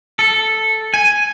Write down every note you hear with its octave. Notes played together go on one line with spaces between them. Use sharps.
A4
G#5